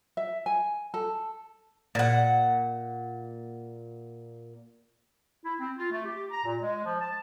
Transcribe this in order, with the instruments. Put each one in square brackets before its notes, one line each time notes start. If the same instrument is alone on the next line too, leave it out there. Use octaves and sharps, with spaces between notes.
[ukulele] E5
G#5
A4
[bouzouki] A#2 F#5
[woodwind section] E4
C4
F4
A3
G4
A#5
A#2
G#3
F3
A5